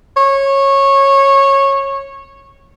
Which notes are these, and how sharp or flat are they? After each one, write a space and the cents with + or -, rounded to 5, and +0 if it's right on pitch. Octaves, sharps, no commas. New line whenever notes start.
C#5 -15